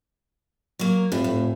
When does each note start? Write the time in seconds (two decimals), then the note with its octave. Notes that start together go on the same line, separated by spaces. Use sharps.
0.79 F#3 A#3
1.12 F1 A2
1.24 A2